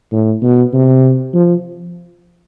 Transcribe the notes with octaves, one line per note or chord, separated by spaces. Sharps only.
A2
B2
C3
F3